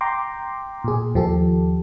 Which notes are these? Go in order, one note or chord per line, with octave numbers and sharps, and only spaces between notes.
G5 A#5 C6 D6
A#2 G#4
D#2 F3 G4 A4